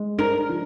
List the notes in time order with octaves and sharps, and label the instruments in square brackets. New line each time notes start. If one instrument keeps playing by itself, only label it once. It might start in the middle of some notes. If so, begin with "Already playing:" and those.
Already playing: [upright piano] G#3
[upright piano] D4 [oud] A#4
[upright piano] F3